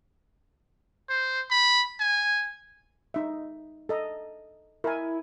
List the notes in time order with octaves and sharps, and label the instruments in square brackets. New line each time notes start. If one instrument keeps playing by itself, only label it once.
[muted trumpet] C5
B5
G#5
[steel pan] D#4 E5
A4 D#5 A#5
[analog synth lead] E4 [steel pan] A#4 G#5